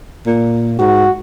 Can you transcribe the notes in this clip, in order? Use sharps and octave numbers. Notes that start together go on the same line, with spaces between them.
A#2
G#2 F#4